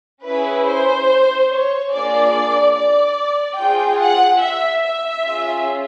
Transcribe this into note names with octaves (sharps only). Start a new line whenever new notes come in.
C#4 E4 G#4 B4
C5
C#5
A#3 D4 F4 G#4 D5
D5
C4 F4 G#4 G5
F#5
E5
E5
C#4 F4 G#4